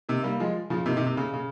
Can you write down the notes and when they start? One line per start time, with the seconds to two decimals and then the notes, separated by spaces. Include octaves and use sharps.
0.09 C3 D#3
0.23 G3 A#3
0.40 F3 G#3
0.70 C#3 F3
0.86 C3 D#3
0.96 C3 D#3
1.06 C3
1.17 C#3
1.34 C#3